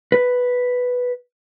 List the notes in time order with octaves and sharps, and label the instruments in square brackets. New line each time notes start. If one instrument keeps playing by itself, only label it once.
[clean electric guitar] B4